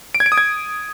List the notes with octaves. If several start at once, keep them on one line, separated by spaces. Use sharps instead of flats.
D7
G#6
D7
D#6
G#6